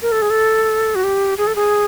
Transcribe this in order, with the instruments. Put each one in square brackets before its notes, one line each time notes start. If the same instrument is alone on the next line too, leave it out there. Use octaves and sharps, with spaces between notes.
[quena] A#4
A4
G#4
A4
F#4
G4
G#4
A4
G#4